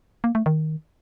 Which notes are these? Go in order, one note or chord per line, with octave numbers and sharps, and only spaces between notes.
A#3
A3
D#3